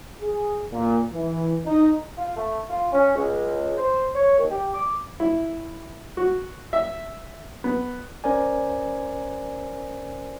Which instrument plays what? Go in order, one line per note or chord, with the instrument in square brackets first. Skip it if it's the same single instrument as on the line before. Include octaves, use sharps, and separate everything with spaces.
[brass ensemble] G#4
A#2
E3
D#4
[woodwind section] F4
A3
F4
C#4
C#2
C5
C#5
D#2
G4
D6
[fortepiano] E4
F#4
E5
B3
[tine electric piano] C#4 A#4 C5 D5 G#5